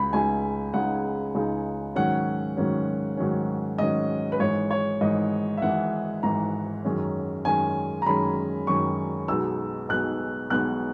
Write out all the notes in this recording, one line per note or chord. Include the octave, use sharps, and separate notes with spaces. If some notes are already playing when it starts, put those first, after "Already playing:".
Already playing: C#2 C#3 G#3 D#4 B5
C#2 C#3 G#3 D#4 G#5
C#2 C#3 G#3 D#4 F#5
C#2 C#3 G#3 D#4
G#2 D#3 F#3 C#4 F#5
G#2 D#3 F#3 C#4
G#2 D#3 F#3 C#4
G#2 D#3 F#3 C#4 D#5
B4
G#1 G#2 E3 C#5
C#5
G#1 G#2 E3 D#5
E5
G#1 G#2 E3 F#5
G#1 G#2 E3 A#5
F#2 D#3 G#3 C#4
F#2 D#3 G#3 C#4 G#5
A#5
F#2 D#3 G#3 C#4 B5
F#2 D#3 G#3 C#4 C#6
B1 B2 G#3 B3 D#4 E6
B1 B2 G#3 B3 D#4 F#6
B1 B2 G#3 B3 D#4 F#6